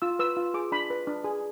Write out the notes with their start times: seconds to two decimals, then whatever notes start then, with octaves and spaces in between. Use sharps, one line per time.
0.02 F4 E6
0.19 B4 E6
0.37 F4
0.54 G#4 D6
0.72 D4 B5
0.90 B4
1.07 D4
1.24 G#4